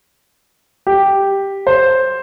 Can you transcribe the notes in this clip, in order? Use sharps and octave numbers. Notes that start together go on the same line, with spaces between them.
G4
C5